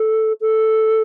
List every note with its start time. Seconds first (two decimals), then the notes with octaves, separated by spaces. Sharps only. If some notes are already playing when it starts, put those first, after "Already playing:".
Already playing: A4
0.41 A4